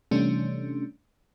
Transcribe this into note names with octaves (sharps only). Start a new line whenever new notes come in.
C3 E3 G3 A3 C#4 D4